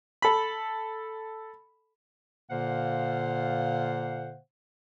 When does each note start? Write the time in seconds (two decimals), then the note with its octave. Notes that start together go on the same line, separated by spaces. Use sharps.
0.22 A4 B5
2.51 A#2 D3 A#3 C5 F5 F#5